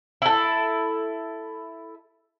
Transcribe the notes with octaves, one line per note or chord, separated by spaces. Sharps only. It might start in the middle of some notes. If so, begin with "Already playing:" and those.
E4 A4